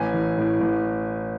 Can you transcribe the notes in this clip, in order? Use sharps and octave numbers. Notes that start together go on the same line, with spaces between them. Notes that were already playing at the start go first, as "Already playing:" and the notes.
Already playing: A1 G#5
E3
A2
A1